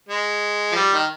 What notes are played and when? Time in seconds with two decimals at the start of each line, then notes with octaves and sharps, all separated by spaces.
0.09 G#3
0.72 F3
0.76 G3
0.93 D#3